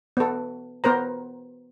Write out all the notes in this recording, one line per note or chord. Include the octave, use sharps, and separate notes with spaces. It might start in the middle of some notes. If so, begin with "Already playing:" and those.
B3 A4
B3 A#4 C5 A#5